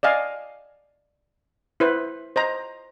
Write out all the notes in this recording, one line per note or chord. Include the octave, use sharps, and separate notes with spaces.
D5 D#5 F5 G#5
E4 B4 C5
C5 D#5 A#5